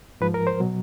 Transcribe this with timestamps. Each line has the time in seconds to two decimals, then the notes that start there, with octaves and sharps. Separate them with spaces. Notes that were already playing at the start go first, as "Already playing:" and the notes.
0.21 G#2 F3 B4
0.34 A#4
0.47 C5
0.60 B2 F#3